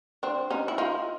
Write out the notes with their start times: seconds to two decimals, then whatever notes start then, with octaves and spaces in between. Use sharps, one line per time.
0.23 C4 D4
0.50 C#4 D#4
0.68 E4
0.78 D#4 F4